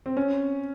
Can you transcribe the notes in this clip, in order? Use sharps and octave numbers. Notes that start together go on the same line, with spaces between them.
C4
C#4